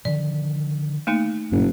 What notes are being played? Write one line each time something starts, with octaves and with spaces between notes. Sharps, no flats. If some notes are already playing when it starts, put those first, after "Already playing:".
D3 D#3 F3 D5
A3 A#3 D#4
F#1 G2 A#2